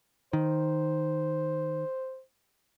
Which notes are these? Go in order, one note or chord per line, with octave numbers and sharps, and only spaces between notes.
D#3 C5